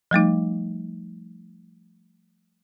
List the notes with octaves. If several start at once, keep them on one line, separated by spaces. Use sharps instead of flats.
F3 G3 A3 D#4